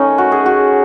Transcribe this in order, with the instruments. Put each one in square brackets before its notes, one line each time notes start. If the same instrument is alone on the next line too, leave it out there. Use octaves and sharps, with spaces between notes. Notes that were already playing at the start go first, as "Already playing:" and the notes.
Already playing: [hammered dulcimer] D#3 A3 C#4 D#4
F#4
G#4
F#4